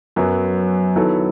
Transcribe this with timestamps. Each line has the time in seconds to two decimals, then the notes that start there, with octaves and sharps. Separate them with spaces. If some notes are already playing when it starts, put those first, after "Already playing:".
0.16 F#2 F#3 B3
0.96 D#3 F#3 B3 E4 A4